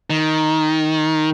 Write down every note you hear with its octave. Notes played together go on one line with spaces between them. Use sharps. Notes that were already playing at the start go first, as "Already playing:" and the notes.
D#3